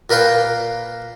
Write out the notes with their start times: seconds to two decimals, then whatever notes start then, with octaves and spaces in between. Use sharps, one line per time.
0.10 A#2 A#4 B4 F5 G5